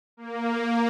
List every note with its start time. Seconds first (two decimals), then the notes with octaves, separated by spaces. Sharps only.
0.17 A#3